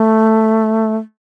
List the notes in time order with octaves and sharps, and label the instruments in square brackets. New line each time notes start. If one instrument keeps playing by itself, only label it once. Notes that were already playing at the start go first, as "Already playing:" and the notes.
Already playing: [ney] A3